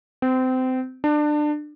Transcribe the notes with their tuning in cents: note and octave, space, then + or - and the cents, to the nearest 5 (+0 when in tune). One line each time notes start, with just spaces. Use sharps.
C4 -25
D4 +25